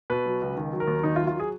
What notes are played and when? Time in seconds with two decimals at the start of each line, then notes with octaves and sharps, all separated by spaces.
0.10 B2 B4
0.26 F#3
0.42 C#2
0.57 D#3
0.73 F#3
0.80 A#4
0.88 D#2
1.03 D#3 D#4
1.16 F4
1.20 F#3
1.27 F4
1.40 G#4